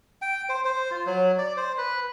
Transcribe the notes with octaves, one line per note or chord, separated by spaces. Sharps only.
G5
C5
C5
F4
F#3
D5
C5
B4